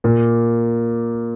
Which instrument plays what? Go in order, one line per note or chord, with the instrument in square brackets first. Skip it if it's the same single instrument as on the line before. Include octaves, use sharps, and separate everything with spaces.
[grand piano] A#2 A#3